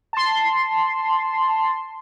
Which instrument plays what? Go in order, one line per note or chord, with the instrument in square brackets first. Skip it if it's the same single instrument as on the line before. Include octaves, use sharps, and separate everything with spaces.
[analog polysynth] A5 C6